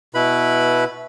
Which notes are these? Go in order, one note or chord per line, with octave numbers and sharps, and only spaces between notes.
B2 E4 B4 B5